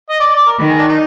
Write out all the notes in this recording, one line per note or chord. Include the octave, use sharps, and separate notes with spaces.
D#5
D5
D5
A#4
D#3 B4
G#4
D4
D#4